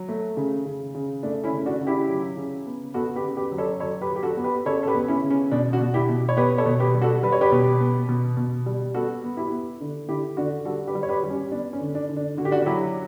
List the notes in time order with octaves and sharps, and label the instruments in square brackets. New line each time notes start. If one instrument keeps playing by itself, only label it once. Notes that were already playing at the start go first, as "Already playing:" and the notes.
Already playing: [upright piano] F#3
A3
C#3
C#3
C#3
A3 D4
C#4 E4
C#3
D4 F#4
C#3
E4 G4
F#3
C#3
B3
B3 F#4 A4
G4 B4
C#3
G4 B4
F#3
A4 C#5
F#3 A4 C#5
G4 B4
F#3
G4
F#4 A4
B3
G4 B4
C#3 A4 C#5
A4
G4 B4
B3
C#4 E4
C#3
C#4
B2 D4
D4 F#4
B2
E4 G4
B2
C#5
B3 G4 B4
A4 C#5
B2
G4 B4
G3
F#4 A4
G3 B4
C#5
G4 B4
B2
B3
B2
B2
G3
B3 F#4 A4
B3
E4 G4
B3
D3
D3 E4 G4
D3 D4 F#4
G3 F#4 A4
G4 B4
G3
C#5
G4 B4
G3
C#4
B3 D4
C#4
D3
D4
D3
D4
D3 F#4
G4
D4 F#4
F#4
F#3 E4 G4